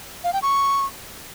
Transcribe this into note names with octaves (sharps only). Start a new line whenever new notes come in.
F5
G5
C#6